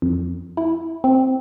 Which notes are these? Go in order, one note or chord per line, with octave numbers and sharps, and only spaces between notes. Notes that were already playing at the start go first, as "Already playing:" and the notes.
F2
E4
C4